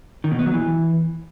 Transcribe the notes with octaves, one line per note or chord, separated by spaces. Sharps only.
D#3
B2
B3
F#3
E3